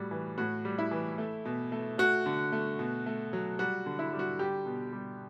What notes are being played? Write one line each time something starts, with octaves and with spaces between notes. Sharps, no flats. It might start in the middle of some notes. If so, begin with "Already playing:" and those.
Already playing: A2 G3 F#4
E3
A2 F#4
G3
E4
E3
A3
B2
A3
A3 F#4
D3
A3
B2
A3
F#3
G3 F#4
D3
E4
G3
F#4
G3 G4
B2
G3